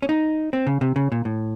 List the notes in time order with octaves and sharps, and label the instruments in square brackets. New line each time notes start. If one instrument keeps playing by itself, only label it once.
[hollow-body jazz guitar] C#4
D#4
C4
C#3
C3
C#3
A#2
A2